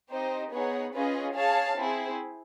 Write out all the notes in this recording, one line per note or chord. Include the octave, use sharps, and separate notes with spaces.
C4 D#4 G4 C5 D#5
B3 D#4 G#4 C#5 F#5
C#4 F4 G#4 B4 D#5
G#4 C#5 F5 A5
C4 E4 G#4